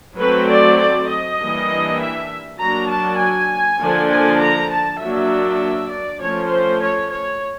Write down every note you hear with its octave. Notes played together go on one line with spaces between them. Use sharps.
F#3 A3 C4 B4
D5
D5
D#5
E3 G3 A#3 D4
E5
F#3 A#3 D4 A#5
A5
G#5
D3 F3 A#3 D4
G#5
A#5
A5
F#3 A#3 D4 E5
D5
F3 A3 C#4 C#5
C5
C#5
C#5